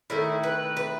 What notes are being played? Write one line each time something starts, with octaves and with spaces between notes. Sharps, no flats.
D#3 A3 E4
B4
B4